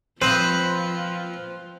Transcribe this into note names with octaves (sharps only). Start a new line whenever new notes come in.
F3 C4 F4 B4 C5 D#5 F5